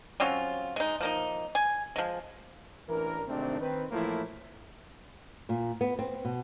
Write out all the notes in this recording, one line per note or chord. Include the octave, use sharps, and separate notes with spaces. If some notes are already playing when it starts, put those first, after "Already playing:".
F#3 C4 C#4 F4
G#3 D#4
F3 A#3 D#4
G#5
F3 G#3
A1 E3 D4 A#4
G#1 C3 D#3 A3 C4 D4
D#3 C4 B4
A2 E3 F3 A3 A#3 E4
A#2
B3
C4
B2